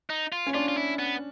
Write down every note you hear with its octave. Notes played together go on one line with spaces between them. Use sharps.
D#4
F4
C#4
D4 F4
F4
E4
B3